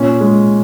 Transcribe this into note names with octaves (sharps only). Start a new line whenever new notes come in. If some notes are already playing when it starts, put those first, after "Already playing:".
Already playing: A#2 C#4
G#3